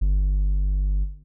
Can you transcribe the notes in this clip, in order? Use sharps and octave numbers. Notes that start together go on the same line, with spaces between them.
G1